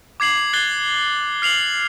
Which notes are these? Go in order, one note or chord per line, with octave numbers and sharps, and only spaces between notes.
D6 G#6 C7 F#7
F#6 G#6 A6 C7 G7
F6 C7 F7 F#7